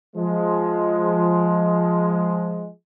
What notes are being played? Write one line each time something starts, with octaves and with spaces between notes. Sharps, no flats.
F3 G#3